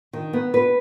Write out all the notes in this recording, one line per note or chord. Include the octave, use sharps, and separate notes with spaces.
D#3
B3
B4